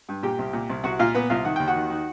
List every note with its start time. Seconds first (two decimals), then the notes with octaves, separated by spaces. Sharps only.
0.09 G2
0.23 A#2 G4 G5
0.39 C2
0.53 A#2
0.70 C2
0.84 C2 F#4 F#5
0.99 A#2 F4 F5
1.15 A#2 B3 B4
1.30 C2 F4 F5
1.44 D#3 F#5
1.56 D#2 G5
1.67 F#4 F#5
1.76 D#3
1.90 D#3